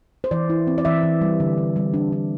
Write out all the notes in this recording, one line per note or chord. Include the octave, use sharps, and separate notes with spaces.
C5
E3 D5
E4
C4
D5
E3 E5
E3
G3
D3
D3
G3
D4
D4